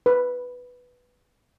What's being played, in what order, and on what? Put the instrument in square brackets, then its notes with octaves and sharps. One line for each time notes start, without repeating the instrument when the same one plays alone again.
[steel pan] B4